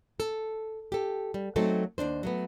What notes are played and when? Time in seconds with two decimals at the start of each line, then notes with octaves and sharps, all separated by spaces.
0.20 A4
0.92 G4 A4
1.34 G3
1.56 F#3 A3 C4 D#4 A4
1.98 D#2 B2 D4 C5
2.23 F#3 A3 B3